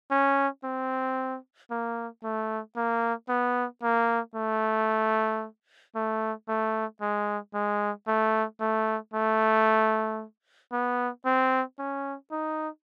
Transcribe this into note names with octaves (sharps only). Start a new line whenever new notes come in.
C#4
C4
A#3
A3
A#3
B3
A#3
A3
A3
A3
G#3
G#3
A3
A3
A3
B3
C4
C#4
D#4